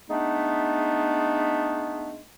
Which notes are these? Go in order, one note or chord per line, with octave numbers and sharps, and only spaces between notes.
G#3 A3 B3 D4 D#4